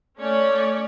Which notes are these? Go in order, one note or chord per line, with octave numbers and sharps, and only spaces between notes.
A3 C#4 C#5 D5